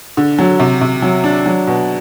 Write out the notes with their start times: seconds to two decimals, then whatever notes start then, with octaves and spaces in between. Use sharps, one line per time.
0.17 D3
0.39 F#3
0.60 C3
0.81 C3
1.02 F#3
1.24 D4
1.46 F#3
1.67 B2